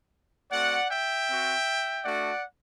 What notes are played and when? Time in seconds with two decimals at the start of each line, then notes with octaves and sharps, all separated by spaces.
0.52 A3 C4 F#4 D5 F#5
0.90 E5 G5
1.29 C4 F#4
2.05 A3 D4 F#4 D5 F#5